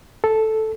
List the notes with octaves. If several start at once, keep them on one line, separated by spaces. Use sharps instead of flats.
A4